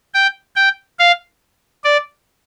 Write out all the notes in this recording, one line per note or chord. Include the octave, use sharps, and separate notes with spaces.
G5
G5
F5
D5